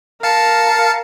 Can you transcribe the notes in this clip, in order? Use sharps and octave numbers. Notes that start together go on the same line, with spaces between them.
A#4 F5 A5 C#7